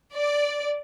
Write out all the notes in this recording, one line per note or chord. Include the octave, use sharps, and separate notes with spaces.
D5